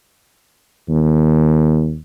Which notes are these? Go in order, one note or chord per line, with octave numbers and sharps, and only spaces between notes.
D#2